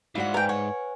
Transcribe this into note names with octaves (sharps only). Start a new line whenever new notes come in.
G#2 E4 F#4 D5 F5 F#5
A#4 B4 G5 G#5
C#5 F#5